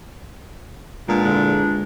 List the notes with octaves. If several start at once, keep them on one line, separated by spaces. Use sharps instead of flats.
A#2 G#3 B3 D4
E2 D3 D4